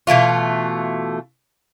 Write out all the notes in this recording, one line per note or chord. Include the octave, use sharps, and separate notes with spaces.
B2 E3 A3 F4